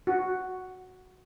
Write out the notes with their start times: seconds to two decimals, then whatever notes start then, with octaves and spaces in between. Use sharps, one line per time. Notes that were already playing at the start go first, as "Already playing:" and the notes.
0.07 F#4